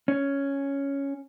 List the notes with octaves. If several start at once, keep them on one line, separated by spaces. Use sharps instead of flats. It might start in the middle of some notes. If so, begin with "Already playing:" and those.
C#4